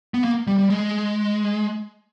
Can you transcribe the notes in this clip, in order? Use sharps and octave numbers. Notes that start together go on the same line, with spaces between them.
B3
A#3
G3
G3
G#3